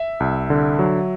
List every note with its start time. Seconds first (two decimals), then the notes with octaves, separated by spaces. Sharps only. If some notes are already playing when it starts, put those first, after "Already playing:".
Already playing: E5
0.20 C2
0.50 D3
0.79 F#3